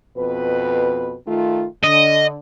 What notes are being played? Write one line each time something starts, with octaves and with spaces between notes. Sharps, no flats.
F2 B2 B4
D#3 A3 F4
D3 D#5